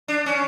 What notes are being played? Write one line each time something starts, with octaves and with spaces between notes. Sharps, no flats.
D4
C#4